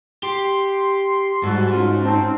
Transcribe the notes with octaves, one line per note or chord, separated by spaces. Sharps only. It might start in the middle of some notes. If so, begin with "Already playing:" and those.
G4 C6
G#2 G3 F#4 A5 E6
C#4 D#4 F4
C4 A5